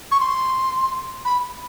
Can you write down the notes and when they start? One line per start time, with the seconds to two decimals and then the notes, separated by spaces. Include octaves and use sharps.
0.12 C#6
0.20 C6
1.25 B5